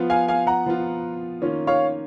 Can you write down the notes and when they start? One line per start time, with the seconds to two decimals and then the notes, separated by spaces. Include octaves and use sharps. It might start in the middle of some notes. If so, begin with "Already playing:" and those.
Already playing: F3 B3 F4
0.10 F5 G#5
0.28 F5 G#5
0.47 F#5 A#5
0.66 F3 B3 F4
1.42 D#3 A#3 C#4 F4
1.67 C#5 F5